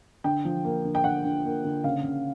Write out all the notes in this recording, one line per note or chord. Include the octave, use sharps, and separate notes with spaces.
D3 G5
F3
A#3
D3
G5
D3 F#5
D3
A#3
D3
C#3 F5
C#3